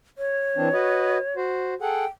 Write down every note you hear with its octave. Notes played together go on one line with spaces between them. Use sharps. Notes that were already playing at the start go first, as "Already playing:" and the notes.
C#5
E3 C4 D4
F#4 B4 D#5
F#4 C5
G#4 A4 F#5 G5